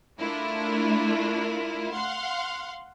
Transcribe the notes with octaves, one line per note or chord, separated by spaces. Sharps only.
A3 D4 E4 F4 A#4
F5 F#5 C6